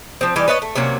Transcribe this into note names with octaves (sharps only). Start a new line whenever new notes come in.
F3 C4
E3 G3 D#4
B4 C#5 D#5 A5
A3
C3 F#3 A#3 C#4